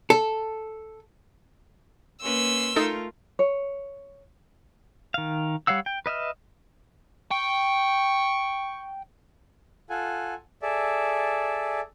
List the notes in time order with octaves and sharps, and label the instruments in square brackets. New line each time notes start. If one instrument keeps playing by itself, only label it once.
[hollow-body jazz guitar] A4
[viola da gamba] A#3 C#4 B4 [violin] C6 E6
[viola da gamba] A3 F4 A#4 [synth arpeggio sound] D#4 A4
[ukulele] C#5
[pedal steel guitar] D#3 F5
G3 C#5 F5 F#5 E6
G5
B4 D#5 E5 F6
[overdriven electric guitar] G5 [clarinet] C#6
[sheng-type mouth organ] F4 A4 F#5 G#5
G#4 A4 D5 E5